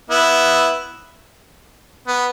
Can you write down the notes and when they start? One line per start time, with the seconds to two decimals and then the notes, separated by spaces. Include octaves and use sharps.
0.10 B3 E4
2.07 B3